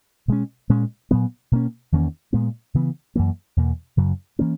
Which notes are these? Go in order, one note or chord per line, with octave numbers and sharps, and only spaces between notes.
B2 G#3 C#4
A#2 G#3 C#4
A#2 F#3 B3
B2 A#3 C#4
E2 D#3 A#3 C#4
A#2 G#3 B3
C#3 E3 B3
F#2 E3 A#3
E2 B2 A#3
F#2 C#3 F#3
E3 A#3 C#4